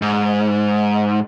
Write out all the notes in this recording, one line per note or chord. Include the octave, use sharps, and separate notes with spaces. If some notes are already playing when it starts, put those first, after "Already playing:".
G#2